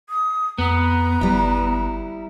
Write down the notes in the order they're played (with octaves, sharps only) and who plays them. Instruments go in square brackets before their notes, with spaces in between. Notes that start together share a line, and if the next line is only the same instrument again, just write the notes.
[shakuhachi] D#6
[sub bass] F2 [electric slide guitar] B3 [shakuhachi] A#5
[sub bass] G1 [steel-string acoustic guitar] G3 E4